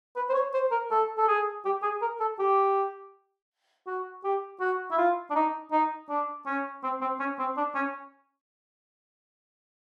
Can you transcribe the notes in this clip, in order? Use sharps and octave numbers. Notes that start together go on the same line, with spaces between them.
B4
C5
C#5
C5
A#4
A4
A4
G#4
G4
G#4
A#4
A4
G4
F#4
G4
F#4
E4
F4
D4
D#4
D#4
D4
C#4
C4
C4
C#4
C4
D4
C#4